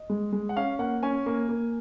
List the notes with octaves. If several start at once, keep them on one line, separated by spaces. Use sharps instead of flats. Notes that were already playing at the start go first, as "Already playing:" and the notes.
Already playing: D#5
G#3
G#3
F#5
C#4 F5
A#3 F#5
C#4 G#5
A#3
A#3